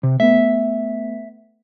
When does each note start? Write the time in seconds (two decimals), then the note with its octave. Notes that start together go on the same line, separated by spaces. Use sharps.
0.03 C3
0.20 A3 B3 E5